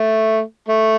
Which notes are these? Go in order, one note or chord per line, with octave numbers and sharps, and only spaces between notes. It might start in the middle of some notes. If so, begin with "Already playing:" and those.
Already playing: A3
A3